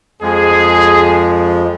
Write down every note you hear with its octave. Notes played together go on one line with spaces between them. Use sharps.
F2 F3 G#3 G#4